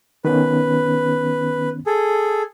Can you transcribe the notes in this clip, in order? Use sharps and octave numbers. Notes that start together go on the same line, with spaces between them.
D#3 B3 C#4 B4
G#4 A4